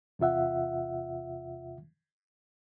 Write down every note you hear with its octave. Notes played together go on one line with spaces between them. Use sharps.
E2 C3 F4 E5 F#5